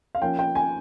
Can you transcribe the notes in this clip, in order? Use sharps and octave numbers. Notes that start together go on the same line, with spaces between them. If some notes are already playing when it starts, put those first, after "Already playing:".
F5
F3 A#3 C#4 G5
G5
G#5